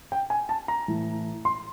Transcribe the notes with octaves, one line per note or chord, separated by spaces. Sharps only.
G5
G#5
A5
A#5
A2 E3
C6